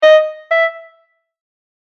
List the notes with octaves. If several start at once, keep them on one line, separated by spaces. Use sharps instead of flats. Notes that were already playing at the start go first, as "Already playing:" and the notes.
D#5
E5